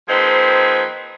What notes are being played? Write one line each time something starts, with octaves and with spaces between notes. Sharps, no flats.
F3 A#3 C4 D#4 G#4 B4